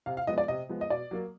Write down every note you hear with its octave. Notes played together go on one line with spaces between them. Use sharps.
C3 F5
F5
F3 G#3 B3 D#5
D5
C3 D#5
F3 G#3 B3
D#5
B2 D5
F#3 A#3